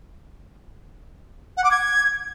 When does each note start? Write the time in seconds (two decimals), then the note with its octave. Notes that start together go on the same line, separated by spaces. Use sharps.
1.57 F#5
1.64 D6
1.71 G#6